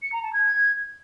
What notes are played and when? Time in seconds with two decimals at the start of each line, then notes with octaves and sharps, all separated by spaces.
0.02 C#7
0.13 A#5
0.23 A5
0.33 G#6